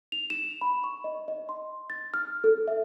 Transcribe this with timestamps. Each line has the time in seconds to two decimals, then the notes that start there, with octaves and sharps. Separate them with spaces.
0.12 F7
0.30 E7
0.61 B5
0.84 C#6
1.04 D#5
1.28 D#5
1.49 C6
1.90 A6
2.14 F6
2.44 A4
2.68 E5